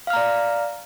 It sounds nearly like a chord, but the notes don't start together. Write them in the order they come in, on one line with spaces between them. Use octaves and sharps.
F5 F6 A#5 D5